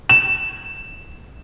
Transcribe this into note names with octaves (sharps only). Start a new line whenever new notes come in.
E7